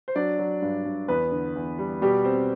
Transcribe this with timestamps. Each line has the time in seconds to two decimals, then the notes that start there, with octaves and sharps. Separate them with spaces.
0.08 C5
0.15 F#3 D4 D5
0.39 F#3
0.62 G2
0.85 G2
1.08 E2 B3 B4
1.32 D3
1.56 E2
1.79 G3
2.01 B2 G3 G4
2.24 C4